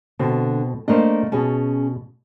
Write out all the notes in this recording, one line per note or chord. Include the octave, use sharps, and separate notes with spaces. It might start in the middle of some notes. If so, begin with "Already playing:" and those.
B2 D3 C4 A5
A3 A#3 D4 A#4 C5 D#5
B2 C#4 G#4 A5